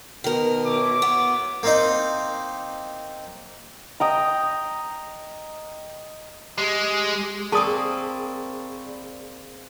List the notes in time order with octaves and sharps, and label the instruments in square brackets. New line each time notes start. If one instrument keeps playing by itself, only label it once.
[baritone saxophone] B2 [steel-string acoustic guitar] D#3 A#4
[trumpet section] E4 C#5 D6
[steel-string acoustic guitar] B3
[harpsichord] A#3 C4 D#4
[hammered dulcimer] D#5 G5 A#5
[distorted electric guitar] G#3 [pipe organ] G4
[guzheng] A#3 C4 [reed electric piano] G#4 [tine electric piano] D5 B5 C#6 [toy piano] A5 D#6